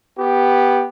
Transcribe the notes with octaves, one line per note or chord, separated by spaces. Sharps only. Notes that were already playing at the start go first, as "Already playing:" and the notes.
B3 G4